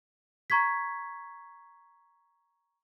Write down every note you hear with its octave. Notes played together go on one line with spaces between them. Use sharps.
A#5 C#6 G#6 B6